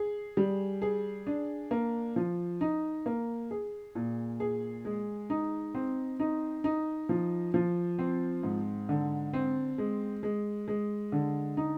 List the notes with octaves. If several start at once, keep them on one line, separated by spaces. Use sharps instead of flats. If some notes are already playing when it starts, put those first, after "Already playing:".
Already playing: G#4
G3
G#4
D4
A#3
F3
D#4
A#3
G#4
A#2
G#4
G#3
D#4
C4
D#4
D#4
F3
F3
C4
G#2
D3
C4
G#3
G#3
G#3
D3
D#4